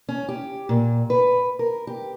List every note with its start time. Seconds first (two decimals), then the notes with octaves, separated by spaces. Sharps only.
0.09 C#4
0.29 G4
0.69 A#2
1.10 B4
1.59 A#4
1.87 G4